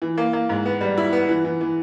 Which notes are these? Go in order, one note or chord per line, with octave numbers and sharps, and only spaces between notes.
E3
A#3
A#3
G#2
B3
G3
E4
B3
E3
E3
E3